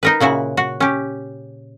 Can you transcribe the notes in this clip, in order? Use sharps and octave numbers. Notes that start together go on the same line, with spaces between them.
D#4 A#4 B4
A#2 C#3 E4 F#4
F#4
C#4 G4